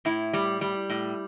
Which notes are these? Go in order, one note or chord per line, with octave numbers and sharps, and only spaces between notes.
A2 E4
G3
G3
A2